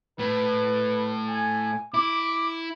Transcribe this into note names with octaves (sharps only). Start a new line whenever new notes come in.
A2 B4
G#5
E4 D6